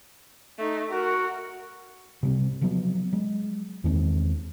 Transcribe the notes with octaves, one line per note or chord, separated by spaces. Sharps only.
A3 D#4
F#4 A#4
C3 G3 C4
C#3 F3 F#3 B3
F#3 G#3
E2 D#3 G#3 C4